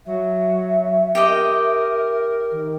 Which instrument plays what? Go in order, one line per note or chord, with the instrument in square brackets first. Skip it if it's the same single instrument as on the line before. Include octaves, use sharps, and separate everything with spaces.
[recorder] F#3 [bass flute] E5
[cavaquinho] G4 D#5 [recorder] A#4
[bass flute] D#3